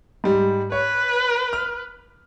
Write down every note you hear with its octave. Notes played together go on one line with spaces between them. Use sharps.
G#2 G3
B4 C#5
F6